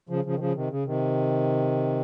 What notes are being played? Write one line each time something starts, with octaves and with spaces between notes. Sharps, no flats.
C#3 F3
C#3 F3
D#3
C#3 F3
C3 D#3
C#3
C3 D#3